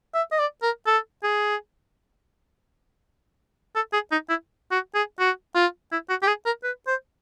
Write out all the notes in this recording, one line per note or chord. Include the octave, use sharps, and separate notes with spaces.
E5
D#5
D5
A#4
A4
G#4
A4
G#4
D#4
E4
F#4
G#4
F#4
F4
E4
F#4
G4
G#4
A#4
B4
C5